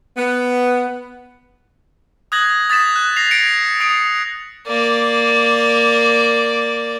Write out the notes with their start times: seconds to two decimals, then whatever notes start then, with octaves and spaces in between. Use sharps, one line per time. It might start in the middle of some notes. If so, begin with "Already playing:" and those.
0.17 B3
2.32 D#6 F#6 G#6 A#6 F#7
2.70 D#6 A6 B6 E7
2.96 F#6
3.16 A#6 C7 F7
3.31 G#6 A#6 C#7 D7
3.80 D#6 C7 D7 F7
4.67 A#3 D5